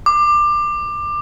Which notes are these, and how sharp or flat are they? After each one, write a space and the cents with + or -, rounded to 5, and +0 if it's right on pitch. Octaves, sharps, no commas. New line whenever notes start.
D6 +20